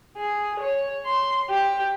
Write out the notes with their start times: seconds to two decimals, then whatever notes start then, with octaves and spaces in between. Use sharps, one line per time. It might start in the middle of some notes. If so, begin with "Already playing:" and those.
0.17 G#4
0.60 C#5
1.05 C6
1.50 G4